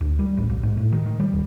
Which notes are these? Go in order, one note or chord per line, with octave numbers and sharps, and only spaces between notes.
D2
G3
A1
B1
G#2
A2
D#3
D#3
G3
D#2